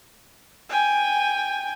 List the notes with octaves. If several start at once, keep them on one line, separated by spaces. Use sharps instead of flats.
G5 G#5